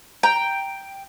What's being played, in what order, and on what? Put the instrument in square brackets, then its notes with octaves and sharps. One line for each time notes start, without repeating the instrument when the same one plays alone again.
[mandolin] G5 [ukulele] A#5